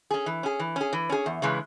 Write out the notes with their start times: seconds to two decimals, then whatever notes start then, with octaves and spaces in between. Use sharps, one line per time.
0.11 C#4 G#4
0.26 E3
0.43 C#4 G#4
0.59 E3
0.76 C#4 G#4
0.93 E3
1.10 C#4 G#4
1.26 E2
1.42 C#3 E3 G#3